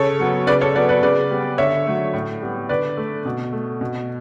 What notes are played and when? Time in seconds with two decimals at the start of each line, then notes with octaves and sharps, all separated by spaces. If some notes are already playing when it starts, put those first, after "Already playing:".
Already playing: C#3 A4 C#5
0.20 F#3 B3
0.47 C#3 B4 D5
0.61 A4 C#5
0.75 F#3 B4 D5
0.78 B3
0.89 B4 D5
1.02 C#3 B4 D5
1.31 G3 B3
1.58 D3 C#5 E5
1.86 F#3 A3
2.13 A2
2.42 G3 B3
2.69 D3 B4 D5
2.97 A3
3.25 B2
3.53 A3
3.81 B2